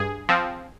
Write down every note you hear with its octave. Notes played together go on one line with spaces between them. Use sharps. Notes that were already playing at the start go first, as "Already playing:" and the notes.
Already playing: G2 G#4
F3 C4